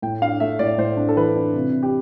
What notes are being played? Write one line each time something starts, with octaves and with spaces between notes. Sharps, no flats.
A2 G5
D4 F5
A3 E5
A2 D5
A2 C5
D4
A4
E3 B4
D4
C3
C3
G4